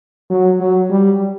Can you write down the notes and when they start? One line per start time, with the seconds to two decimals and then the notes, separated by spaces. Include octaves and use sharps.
0.30 F#3
0.60 F#3
0.90 G3